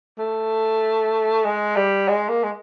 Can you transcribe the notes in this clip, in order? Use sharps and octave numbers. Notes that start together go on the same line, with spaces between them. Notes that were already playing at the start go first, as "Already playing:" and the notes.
A3
G#3
G3
G#3
A#3
G#3